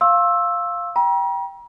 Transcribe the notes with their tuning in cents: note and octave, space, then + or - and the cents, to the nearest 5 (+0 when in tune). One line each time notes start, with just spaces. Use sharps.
F5 +0 C6 +40 E6 +0
G5 +0 A#5 +45